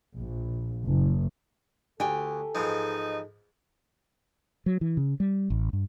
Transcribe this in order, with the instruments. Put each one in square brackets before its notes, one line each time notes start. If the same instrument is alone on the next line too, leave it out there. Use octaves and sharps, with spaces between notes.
[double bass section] A#1
F#1
[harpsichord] D2 [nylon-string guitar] G4 G5 G#5 [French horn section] A4
[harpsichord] G#2 E3 F3 [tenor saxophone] D#4
[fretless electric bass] F#3
E3
C#3
G3
A1
G2